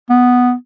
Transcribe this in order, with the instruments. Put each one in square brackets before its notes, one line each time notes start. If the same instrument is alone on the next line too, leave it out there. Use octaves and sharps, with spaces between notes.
[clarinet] B3